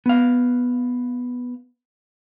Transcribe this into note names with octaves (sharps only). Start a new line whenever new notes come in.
B3 F5